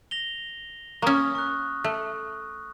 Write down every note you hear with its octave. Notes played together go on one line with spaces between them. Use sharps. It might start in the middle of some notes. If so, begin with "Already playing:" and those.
A#6 F7 G7
A#3 C#4 C#6 D#6 F6
C#6 F#6
A3